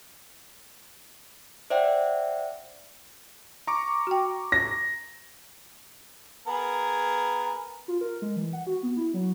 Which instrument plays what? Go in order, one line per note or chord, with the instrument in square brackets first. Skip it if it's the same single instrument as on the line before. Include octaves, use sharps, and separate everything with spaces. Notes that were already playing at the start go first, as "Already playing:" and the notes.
[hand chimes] C5 D5 E5 F#5 G5
[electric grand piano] A#5 C#6 D6
[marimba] F#4 G5
[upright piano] A#6
[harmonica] B3 G#4 A#4
[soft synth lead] F4
A#4
G#3
E3
F#5
F#4
B3
E4
F#3